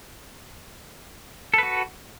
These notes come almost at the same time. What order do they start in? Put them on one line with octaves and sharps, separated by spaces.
A4 B4 F#4